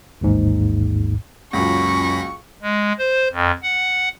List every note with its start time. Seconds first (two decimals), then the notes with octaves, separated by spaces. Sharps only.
0.21 A1 D#2 G#2
1.53 C#2 F#2 A#2 F#3 C#4 B5 C#6 A#6
2.62 G#3
2.99 C5
3.32 F2
3.63 F#5